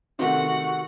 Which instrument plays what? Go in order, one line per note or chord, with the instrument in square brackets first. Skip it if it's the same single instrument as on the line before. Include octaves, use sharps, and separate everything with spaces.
[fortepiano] C3 D#3 A3 [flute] F#4 [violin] F#5